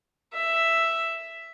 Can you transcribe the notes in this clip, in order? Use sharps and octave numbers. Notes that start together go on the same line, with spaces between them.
E5